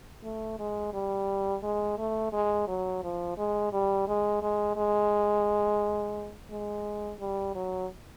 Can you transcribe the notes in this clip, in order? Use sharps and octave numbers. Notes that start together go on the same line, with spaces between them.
A3
G#3
G3
G#3
A3
G#3
F#3
F3
G#3
G3
G#3
G#3
G#3
G#3
G3
F#3